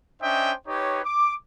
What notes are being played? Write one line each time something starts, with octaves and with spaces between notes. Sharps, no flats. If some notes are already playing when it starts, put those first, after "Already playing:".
C#4 D4 C5 D#5 E5 G5
D#4 G4 B4 C#5
D6